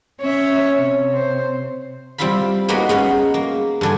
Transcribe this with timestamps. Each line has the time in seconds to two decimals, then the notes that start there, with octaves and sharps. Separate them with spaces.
0.21 C#4 C#5 E5
0.76 C3
1.15 C5
2.18 G3 C4 E4 F4 F5 B5
2.68 G#3 A#3 B3 D#4 F#4 B4
2.89 G#3 B3 C#4
3.34 A#3
3.81 G2 D3 G#5